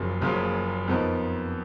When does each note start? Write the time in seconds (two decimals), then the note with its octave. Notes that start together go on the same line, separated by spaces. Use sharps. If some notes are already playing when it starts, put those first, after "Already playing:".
Already playing: F#1 F#2 C#3 F3 A#3
0.21 F#1 F#2 C#3 F3 A#3
0.88 F2 F3 B3 D#4 A#4